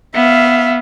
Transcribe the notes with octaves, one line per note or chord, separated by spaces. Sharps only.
B3 E5 F5